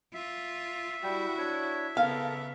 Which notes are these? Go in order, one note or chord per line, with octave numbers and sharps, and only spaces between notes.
F4 E5
G3 E4 F#4 G5
D4 C#5
C#3 B3 A4 A#4 F5